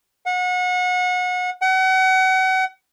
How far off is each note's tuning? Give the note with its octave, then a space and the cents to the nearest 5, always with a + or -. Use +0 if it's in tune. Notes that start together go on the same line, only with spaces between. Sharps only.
F#5 -30
F#5 +35